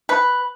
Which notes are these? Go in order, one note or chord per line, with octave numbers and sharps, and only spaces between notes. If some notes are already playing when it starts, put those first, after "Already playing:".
B4